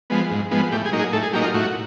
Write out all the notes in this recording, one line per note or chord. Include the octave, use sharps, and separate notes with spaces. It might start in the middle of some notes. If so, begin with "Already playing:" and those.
F3 G#3 B3
G#2
F3 G#3 B3
A2 G4
G#4
F#3 A#3 D#4
G#4
A2 A4
G#4
F#3 A#3 D#4 G4
F4
A2 F#4